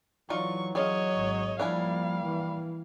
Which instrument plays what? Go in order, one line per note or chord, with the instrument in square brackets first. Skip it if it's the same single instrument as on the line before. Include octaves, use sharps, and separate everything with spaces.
[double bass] E3 [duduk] F#3 [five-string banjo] D#4 F4 D5 [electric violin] C#6
[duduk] F#3 [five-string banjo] C#4 F4 G#4 [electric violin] C#5 D#5
[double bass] G#1
[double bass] F3 A#3 [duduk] G3 [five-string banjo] D4 E4 G#5 [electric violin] F5
[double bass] E3